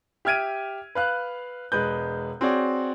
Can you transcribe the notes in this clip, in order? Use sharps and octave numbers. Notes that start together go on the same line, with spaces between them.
G4 E5 F6 G#6 D7 D#7
B4 F5 F#6
E1 G#3 B4 G6
C4 F#4 G#4 C#5 D5